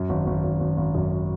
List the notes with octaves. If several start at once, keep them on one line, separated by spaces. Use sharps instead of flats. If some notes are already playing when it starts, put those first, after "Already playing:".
Already playing: F#2
G#1
G#1
G#1
G#1
G#1
F#2